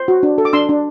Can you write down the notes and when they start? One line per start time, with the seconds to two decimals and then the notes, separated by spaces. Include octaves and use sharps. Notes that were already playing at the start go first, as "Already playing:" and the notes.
Already playing: C5
0.08 F#4
0.23 D4
0.38 A4
0.45 D6
0.53 D4 C6 E6
0.69 D4